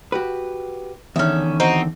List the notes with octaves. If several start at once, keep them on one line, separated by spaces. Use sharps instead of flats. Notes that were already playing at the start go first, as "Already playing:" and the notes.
F#4 G4 B4
E2 D3 D#3 C#4 E5
C4 D#4 F#4